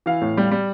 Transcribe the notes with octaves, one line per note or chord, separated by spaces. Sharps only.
E3 F5
A2
G3
G3